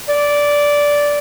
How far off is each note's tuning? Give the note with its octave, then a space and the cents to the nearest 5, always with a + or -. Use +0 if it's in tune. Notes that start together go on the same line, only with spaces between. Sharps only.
D5 -10